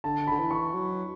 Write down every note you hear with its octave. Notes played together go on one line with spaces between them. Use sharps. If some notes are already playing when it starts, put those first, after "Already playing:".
D3 A5
D3 B5
E3
C#6
F#3